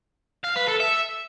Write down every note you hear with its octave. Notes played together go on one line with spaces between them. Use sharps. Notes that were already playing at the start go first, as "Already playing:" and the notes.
F5
B4
A4
E5